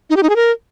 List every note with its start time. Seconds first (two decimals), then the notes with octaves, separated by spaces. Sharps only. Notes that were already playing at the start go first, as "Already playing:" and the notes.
0.10 D#4
0.17 G4
0.23 D#4
0.29 G#4
0.36 A#4